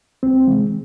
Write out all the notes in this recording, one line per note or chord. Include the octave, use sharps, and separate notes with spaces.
C2 C4
C3 E3 G#3